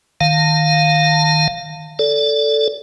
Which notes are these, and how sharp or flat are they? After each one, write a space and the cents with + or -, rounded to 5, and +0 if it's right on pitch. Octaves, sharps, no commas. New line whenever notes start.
D#3 -5 F5 +0 A5 +30
A4 +0 D5 -20